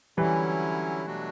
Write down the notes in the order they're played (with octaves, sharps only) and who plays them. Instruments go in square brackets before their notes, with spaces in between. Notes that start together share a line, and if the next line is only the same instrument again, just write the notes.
[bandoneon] D3 F#3 C#4 E4 [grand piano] E3 G3
[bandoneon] B2 F#3 A3 D4 F#4